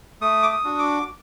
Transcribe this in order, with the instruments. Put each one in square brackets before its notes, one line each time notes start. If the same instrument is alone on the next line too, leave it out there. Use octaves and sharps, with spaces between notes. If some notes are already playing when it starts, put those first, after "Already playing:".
[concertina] A3 D#6
D6
D#6
D4 F#4
D6